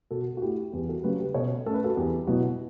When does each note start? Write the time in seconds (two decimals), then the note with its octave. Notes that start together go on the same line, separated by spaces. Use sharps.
0.11 B2 F#4 A4
0.37 F#4
0.42 A3 E4 G4
0.72 E2 G4
0.89 F#4 A4
1.04 C#3 F#3 A3 G4 B4
1.20 G4 B4
1.34 B2 A4 C#5
1.66 A3 C#4 A4
1.74 B4
1.84 F#4 A4
1.97 E2 G4
2.27 B2 F#3 B3 E4 F#4